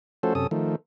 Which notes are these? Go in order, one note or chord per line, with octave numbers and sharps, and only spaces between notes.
F3 A3 C#4 F#4 A4 C5
F#2 C3 C#4 A4 D#6
D#3 F3 A3